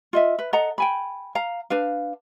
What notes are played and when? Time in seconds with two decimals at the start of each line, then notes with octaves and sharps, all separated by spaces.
0.13 F4 D#5 E5
0.39 B4
0.53 A4 D#5 F#5 A#5
0.78 G5 G#5 B5
1.35 F5 A#5
1.70 D4 B4 F5